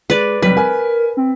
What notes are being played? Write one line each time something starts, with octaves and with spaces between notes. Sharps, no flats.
G#3 B4 D5
F1 F#3 G3 B4 B6
A#4 G#5
C4